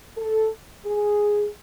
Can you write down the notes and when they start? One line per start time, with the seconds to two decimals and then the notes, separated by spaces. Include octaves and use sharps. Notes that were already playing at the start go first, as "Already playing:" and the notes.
0.17 A4
0.86 G#4